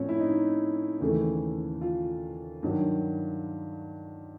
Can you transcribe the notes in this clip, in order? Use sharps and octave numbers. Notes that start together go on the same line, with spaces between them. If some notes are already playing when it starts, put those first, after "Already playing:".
Already playing: A2 F3 C4 C#4
E4
D#4
D#2 C#3 E3 A3
F4
G2 D#3 F#3